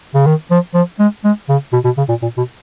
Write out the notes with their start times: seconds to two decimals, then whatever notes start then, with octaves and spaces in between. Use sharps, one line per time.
0.15 C#3
0.27 D#3
0.51 F3
0.74 F3
0.99 G#3
1.24 G#3
1.49 C#3
1.73 B2
1.85 B2
1.98 C#3
2.09 A#2
2.22 A#2
2.37 B2